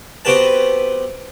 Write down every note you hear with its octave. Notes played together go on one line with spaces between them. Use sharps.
B3 C4 F#4 G4 B4 A5